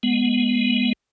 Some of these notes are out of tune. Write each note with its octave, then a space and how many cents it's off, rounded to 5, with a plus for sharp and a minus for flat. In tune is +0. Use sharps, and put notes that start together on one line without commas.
G#3 +0 B3 -10